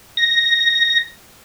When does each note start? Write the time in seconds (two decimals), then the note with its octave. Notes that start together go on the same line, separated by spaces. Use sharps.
0.17 A#6